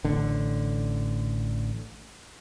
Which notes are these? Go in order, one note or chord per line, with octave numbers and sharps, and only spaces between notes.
A1 D3